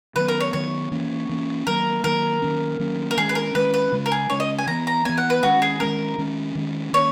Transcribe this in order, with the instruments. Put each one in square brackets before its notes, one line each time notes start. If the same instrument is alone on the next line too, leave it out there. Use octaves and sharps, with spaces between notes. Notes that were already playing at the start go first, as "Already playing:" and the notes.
[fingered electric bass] D#3 F#3 B3 [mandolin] B4
[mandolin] A#4
C#5
[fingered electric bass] D#3 F#3 B3 [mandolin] C#5
[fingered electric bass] E3 A#3 C#4
E3 A#3 C#4
[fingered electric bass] D#3 F#3 A#3 [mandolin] A#4
[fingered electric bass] D#3 F#3 A#3 [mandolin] A#4
[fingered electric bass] D#3 F#3 A#3 C#4
D#3 F#3 A#3 C#4
[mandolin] A#4
[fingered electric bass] D#3 G#3 C#4 [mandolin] G#4
[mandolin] B4
A#4
[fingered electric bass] D#3 G#3 C#4 [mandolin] B4
[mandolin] B4
[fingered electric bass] C#3 G#3 C#4
[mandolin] A#4
G#4
[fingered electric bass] C#3 G#3 C#4 [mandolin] C#5
[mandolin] D#5
G#5
[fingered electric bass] E3 B3 [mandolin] A#5
[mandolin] A#5
[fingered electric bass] E3 B3 [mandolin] G#5
[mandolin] F#5
B4
[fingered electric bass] D#3 G#3 C#4 [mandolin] F#4
[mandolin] G#4
[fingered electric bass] D#3 G#3 C#4 [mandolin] A#4
[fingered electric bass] D#3 G#3 C#4
D#3 G#3 C#4
[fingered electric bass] D#3 A#3 C#4 [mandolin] C#5